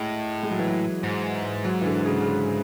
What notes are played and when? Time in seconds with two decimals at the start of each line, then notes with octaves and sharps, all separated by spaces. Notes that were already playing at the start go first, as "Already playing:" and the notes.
Already playing: A2 G#3
0.43 G#3
0.51 F#3
0.59 E3
0.68 F#3
1.03 G#2
1.65 F#3
1.81 E3
1.86 D3
2.06 C#3
2.21 C#3
2.26 D3